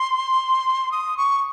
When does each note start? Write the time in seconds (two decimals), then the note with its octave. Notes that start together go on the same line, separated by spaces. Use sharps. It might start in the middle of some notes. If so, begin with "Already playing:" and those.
Already playing: C6
0.92 D#6
1.17 C#6